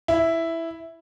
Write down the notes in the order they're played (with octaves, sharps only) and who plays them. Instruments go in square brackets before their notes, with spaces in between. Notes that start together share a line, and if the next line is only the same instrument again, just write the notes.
[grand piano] E4